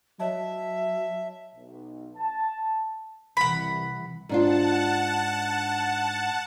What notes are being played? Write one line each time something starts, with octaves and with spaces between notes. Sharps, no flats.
F#3 C#5 D#5 E5 A5
B1
A5
C2 E3 F#5 B5
G#2 D4 F4 F#5 A5